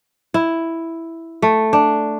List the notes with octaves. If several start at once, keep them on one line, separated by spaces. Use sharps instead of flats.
E4
A3
D4